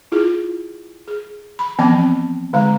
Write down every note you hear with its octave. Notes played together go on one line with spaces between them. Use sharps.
E4 F4 G#4
G#4
B5
E3 F3 B3 C4 A5 B5
D3 G#3 A#5